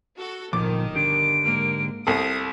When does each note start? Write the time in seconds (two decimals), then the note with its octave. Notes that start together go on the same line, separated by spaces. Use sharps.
0.18 F#4 A4
0.53 G1 A#2 D#3 F3 D6
0.95 D3 D4 G4 D7
1.42 G#2 A#3
2.07 C2 A4 D#6 C7